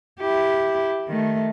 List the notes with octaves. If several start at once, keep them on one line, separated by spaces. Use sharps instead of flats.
E4 G4
D#3 A3